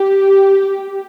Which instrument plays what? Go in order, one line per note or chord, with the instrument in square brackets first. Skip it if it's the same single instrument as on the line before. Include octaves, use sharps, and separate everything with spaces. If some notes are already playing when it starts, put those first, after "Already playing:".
Already playing: [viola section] G4